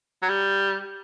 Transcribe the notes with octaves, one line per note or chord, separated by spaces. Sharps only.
F#3
G3